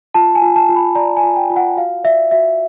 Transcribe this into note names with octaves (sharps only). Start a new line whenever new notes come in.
F4 A5
G#5
F4
A5
F4
B5
D5 A#5
G#5
F4
G5
F4
F#5
F#4 F5
D5 E5
F#4 E5